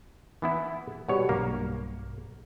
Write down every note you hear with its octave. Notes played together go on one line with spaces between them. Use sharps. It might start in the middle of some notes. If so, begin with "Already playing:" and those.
E3 B3 E4
B2 G3 F#4 C#5
B1 G2 A#3